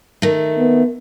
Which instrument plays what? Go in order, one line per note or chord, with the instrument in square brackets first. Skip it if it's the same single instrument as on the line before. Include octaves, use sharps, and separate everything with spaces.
[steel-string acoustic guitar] D#3 A3
[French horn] B3